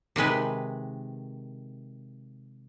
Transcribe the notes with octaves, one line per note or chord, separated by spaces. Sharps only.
C3 D#3 G#3 B4